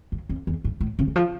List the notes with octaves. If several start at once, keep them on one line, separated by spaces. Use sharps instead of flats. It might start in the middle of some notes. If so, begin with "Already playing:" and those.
G2
F2
E2
G2
A2
C3
E3
F3